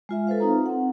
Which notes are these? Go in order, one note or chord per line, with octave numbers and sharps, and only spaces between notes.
G#3 F4 E5
A4 B4 C5 F5
C4 D#4 F4 A#5
C4 F#5